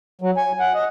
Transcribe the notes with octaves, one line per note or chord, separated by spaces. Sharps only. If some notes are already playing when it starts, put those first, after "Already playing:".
F#3
G#5
F#5
D#5